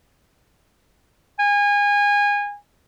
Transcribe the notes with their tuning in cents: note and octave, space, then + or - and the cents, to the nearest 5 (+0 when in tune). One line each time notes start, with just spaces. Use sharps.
G#5 -25